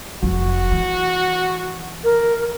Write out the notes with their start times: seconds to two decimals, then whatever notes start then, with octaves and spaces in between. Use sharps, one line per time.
0.23 F1 F3 F#4
0.71 E3
2.04 A#4